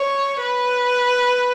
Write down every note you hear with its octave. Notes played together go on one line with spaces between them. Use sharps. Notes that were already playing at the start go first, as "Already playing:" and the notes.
Already playing: C#5
B4